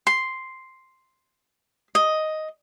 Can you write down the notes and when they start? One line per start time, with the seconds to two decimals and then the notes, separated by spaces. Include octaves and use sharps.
0.07 C6
1.95 D#5